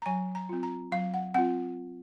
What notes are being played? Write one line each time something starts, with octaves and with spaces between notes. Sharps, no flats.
A#5
F#3 G#5
A#5
C4 F4
A#5
F#3 F5
F#5
C4 F4 F#5